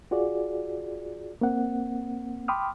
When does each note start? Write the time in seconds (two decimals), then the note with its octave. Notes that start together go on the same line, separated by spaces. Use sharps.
0.11 F4 F#4 G#4 D5
1.41 A#3 C4 F#5
2.48 G5 B5 C6 D6 D#6 F6